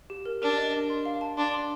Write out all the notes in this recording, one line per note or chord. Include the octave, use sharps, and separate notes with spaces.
G4
A#4
D4 A#4
D#5
A#4
C6
F5
A5
D4 C6
C6